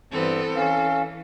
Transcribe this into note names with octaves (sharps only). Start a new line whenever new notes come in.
G2 E3 B3 C4 A4
E3 C#4 F5